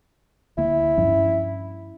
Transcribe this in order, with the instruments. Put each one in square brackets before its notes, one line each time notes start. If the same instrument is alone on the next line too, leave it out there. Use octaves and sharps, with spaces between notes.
[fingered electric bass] D2 A#3 [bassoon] E4
[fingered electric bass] G2 F3 C#4